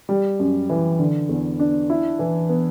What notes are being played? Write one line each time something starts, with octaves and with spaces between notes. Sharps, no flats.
G3
F#2
E3
D3
E2
D4
E4
E3
B3